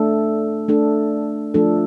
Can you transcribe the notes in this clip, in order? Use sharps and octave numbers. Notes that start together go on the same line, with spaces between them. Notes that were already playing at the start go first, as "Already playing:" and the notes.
Already playing: A3 D4 A4
A3 D4 A4
F3 A3 D4 A4